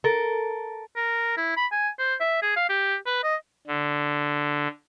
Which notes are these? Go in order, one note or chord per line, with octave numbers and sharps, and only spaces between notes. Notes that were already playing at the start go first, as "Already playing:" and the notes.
A4 A#4
A#4
E4
B5
G#5
C5
E5
G#4
F5
G4
B4
D#5
D3